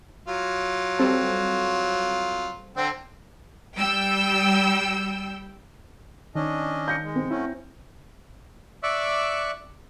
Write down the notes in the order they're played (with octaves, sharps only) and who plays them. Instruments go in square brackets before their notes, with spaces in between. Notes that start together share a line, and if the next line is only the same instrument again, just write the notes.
[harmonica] F#3 F4
[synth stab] G3 C4 A4
[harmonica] D3 C4
[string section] G3 G5 E6
[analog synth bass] D#3 [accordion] C#4 D4 D#5
[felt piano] G6 A#6 C#7
[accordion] G#3
[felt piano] C4
[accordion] F#3 A3 C#4 [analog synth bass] E4
[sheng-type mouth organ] D5 E5 C#6 D6 E6 F#6